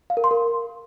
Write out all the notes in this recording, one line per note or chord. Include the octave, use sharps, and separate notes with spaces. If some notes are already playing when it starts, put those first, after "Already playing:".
F5
A#4
C6
A#4